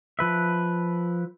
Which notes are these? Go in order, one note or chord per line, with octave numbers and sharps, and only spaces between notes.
F3 B4 E5